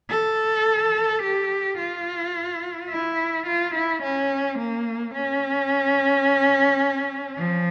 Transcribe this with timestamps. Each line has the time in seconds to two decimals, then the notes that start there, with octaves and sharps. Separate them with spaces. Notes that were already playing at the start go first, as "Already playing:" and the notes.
0.10 A4
1.23 G4
1.78 F4
2.90 E4
3.47 F4
3.75 E4
4.03 C#4
4.59 A#3
5.14 C#4
7.39 F3